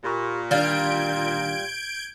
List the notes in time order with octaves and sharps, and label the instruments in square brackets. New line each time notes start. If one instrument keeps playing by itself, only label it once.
[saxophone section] A#2 [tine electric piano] G4 B5 C#6
[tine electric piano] D#3 D4 [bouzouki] G3 F4 [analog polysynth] G6 G#6 D7